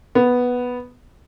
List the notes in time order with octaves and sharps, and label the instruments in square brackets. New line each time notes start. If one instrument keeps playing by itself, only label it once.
[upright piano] B3